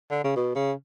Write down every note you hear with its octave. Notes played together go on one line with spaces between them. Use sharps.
D3
C#3
B2
C#3